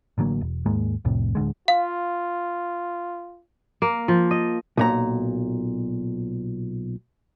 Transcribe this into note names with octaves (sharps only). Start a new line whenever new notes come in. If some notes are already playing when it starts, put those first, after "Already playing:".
A1 D3 F#3 A#3
E1
D#2 G#2 G#3 A#3
C2 F2 A2 C3
D1 D3 G#3
F4 F5
A#3
F3
D#5
B1 A#2 A#5